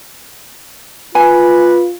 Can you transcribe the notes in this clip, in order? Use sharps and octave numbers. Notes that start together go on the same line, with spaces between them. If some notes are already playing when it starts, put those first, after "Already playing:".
F4 B4 G#5